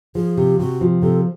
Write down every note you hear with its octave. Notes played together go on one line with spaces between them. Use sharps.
F3 G#4
C3 G4
C3 F#4
F3
C3 A4